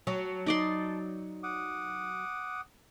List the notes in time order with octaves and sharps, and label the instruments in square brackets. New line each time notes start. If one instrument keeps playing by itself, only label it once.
[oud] F#3 [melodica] A5
[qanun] D#4 D5 C6
[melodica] F#5 D6 D#6